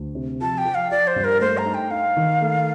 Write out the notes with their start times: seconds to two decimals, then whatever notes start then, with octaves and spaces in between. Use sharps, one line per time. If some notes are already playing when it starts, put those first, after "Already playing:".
Already playing: D2
0.15 C3
0.41 F3 A5
0.58 G5
0.65 F3
0.75 F5
0.91 F3 D5
1.07 C5
1.16 G2
1.24 A#4
1.41 A3 C5
1.58 A#5
1.66 D#4
1.74 G5
1.91 D#4 F5
2.17 D#3
2.41 A3